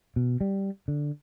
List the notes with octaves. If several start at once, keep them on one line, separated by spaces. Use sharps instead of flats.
B2
G3
D3